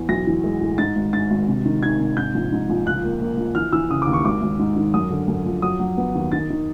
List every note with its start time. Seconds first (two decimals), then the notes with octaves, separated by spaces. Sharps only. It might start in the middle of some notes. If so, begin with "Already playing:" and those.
Already playing: E2
0.09 B1 A#6
0.27 E3
0.44 G#3
0.61 A2
0.78 G#2 A6
0.96 G#1
1.13 G#2 A6
1.30 G#1
1.48 C3
1.65 D#3
1.83 D#3 G#6
2.00 C3
2.17 G#2 G6
2.35 A#1
2.52 G#2
2.69 A#1
2.86 C#2 F#6
3.04 A#3
3.21 A#3
3.38 F3
3.55 E3 F6
3.73 E3 E6
3.90 C#3 D#6
4.02 D6
4.07 D#2
4.13 C#6
4.25 G#1 D6
4.42 G#1
4.59 G#2
4.76 D#3
4.94 F#2 D#6
5.11 D3
5.28 F#2
5.46 F3
5.62 F#3 D#6
5.80 F#3
5.97 B3
6.15 D#2
6.32 D#3 A6
6.50 D#3